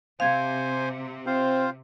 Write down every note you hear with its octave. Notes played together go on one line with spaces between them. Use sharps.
C3 C5 F5 G#5 G#6
C4 F4 C5 F5